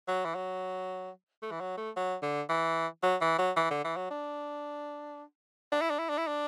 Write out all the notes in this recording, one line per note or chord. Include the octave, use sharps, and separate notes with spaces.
F#3
E3
F#3
A3
E3
F#3
A3
F#3
D3
E3
F#3
E3
F#3
E3
D3
E3
F#3
D4
D4
E4
D4
E4
D4
E4
D4